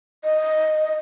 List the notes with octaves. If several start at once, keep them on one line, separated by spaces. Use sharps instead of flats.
D#5